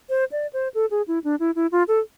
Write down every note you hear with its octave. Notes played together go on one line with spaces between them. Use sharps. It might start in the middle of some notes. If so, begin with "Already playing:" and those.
C5
D5
C5
A4
G#4
E4
D4
E4
E4
F4
A4